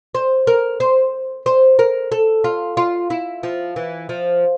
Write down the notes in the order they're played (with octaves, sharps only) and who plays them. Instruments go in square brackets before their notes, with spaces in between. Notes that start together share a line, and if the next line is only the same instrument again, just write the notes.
[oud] C5
A#4
C5
C5
A#4
A4
F4
F4
E4
F3
E3
F3